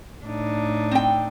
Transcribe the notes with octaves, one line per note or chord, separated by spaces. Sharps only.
A2 D4 D#4
C4 G5